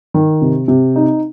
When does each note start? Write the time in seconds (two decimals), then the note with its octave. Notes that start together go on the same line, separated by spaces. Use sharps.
0.14 D#3
0.42 C3
0.68 C3
0.96 D#4